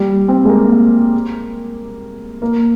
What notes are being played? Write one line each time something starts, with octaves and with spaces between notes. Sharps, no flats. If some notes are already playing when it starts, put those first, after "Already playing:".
Already playing: G3
C4
G#3
A#3
A#3